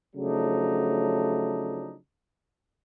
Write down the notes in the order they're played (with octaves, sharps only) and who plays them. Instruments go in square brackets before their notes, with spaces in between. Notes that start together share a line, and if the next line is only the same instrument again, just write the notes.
[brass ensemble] C#3 F3 F#3 A3 D4 D#4